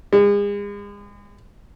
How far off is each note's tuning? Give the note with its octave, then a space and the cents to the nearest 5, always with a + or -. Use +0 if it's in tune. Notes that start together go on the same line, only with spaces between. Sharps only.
G#3 -40